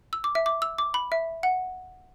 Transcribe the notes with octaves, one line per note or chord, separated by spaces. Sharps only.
E6
D6
E5
D6
E6
D6
B5
E5
F#5